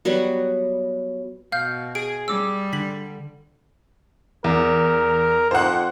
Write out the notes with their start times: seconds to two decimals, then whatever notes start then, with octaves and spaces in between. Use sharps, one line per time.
0.05 F#3 G3 B3 F#4
1.52 B2 F5 F6 G6
1.95 G#4 D7
2.28 G3 D6 E6
2.73 D3 B6 F#7
4.44 E2 A#4
5.51 F2 C5 F#5